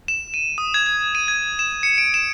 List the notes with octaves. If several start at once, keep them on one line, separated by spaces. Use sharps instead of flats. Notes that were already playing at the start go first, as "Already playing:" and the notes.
E7
D#7
D#6
G#6
G#6
D#7
G#6
E7
C#7
D7
E7